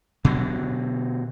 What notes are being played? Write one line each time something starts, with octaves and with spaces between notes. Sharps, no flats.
B2 D3 F#3